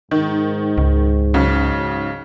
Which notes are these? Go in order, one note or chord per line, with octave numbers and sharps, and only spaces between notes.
G#2 D#3
C#2
B1 C#3